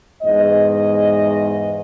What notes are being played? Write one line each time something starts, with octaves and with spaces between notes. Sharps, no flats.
E2 G#2 D#5